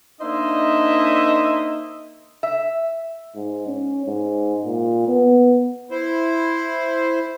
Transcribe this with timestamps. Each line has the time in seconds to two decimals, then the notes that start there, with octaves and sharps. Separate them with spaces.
0.21 A#3 D4 D#4 C5 D#5 E5
2.43 E5
3.35 G#2
3.67 C#4
4.06 G#2
4.65 A#2
5.08 B3
5.90 E4 C5